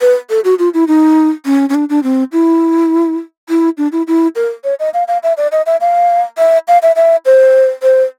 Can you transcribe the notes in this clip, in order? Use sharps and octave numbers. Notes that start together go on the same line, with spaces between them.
B4
A4
F#4
F4
E4
D#4
C#4
C#4
D4
D4
C4
E4
E4
D4
E4
E4
A#4
C#5
D#5
F5
F5
E5
D5
D#5
E5
F5
E5
F5
E5
E5
C5
C5